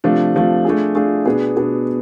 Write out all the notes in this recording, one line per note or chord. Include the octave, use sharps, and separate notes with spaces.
C3 F3 A3 D4
C3 F3 A3 D4
A3 D4 F4 G#4
A3 D4 F4 G#4
B2 B3 D4 G#4
B2 B3 D4 G#4